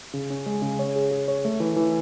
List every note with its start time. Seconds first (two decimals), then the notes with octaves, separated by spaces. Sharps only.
0.14 C#3
0.30 C#4
0.46 G#3
0.62 C#3
0.79 C#5
0.96 G#4
1.11 G#4
1.28 C#5
1.45 A3
1.60 E3
1.76 E3